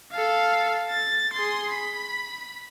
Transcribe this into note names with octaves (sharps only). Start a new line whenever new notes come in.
A4 F5
A6
G#4 C6
B5